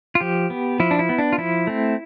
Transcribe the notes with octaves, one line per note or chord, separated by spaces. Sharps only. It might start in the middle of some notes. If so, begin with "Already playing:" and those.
F4
F3 G4
B3
F3 E4
D4
E4
B3
D4
F4
F3 E4
A3 C4